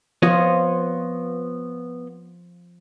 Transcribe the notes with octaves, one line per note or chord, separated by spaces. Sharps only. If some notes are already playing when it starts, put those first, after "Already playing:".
F3 B3 F4 C#5 D#5